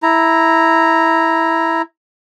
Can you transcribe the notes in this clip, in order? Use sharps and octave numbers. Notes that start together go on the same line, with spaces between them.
E4 A#5